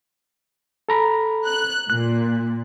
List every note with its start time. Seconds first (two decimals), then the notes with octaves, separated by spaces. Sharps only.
0.89 A4 A#5 B5
1.45 F#6
1.90 A#2 F#6